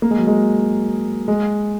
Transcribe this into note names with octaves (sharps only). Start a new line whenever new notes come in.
A#3
G#3
F#3
G#3
G#3